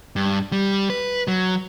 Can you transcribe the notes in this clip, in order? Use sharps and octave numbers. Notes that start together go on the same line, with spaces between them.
G2
G3
B4
F#3